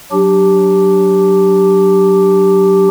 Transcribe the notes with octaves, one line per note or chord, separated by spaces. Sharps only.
F#3 D4 G4